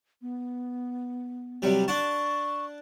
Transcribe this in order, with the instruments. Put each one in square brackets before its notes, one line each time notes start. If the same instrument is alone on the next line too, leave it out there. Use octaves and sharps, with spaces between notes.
[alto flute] B3
[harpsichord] C3 F#3 G3
[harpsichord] D4 F#5 A5 [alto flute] C#6